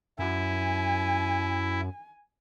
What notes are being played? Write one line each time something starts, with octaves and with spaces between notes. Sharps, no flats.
F#2 E4 G#5